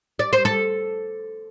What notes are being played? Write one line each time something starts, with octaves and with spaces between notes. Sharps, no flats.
D5
C5
A4